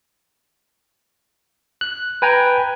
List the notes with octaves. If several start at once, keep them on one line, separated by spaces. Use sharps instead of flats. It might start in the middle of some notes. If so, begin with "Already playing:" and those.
F#6
B4 G5 G#5 A#5